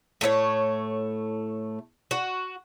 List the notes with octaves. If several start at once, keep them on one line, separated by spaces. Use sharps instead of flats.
A2 A3 E4 C#5
F#4